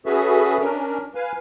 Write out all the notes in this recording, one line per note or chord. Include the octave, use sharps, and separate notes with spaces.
C#4 F#4 G#4 A4 B4 E5
C#4 D4 A#4
B4 F5 G#5